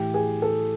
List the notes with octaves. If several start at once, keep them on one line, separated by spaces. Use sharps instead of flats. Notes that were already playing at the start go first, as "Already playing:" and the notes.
Already playing: A2 E3 G4
G#4
A4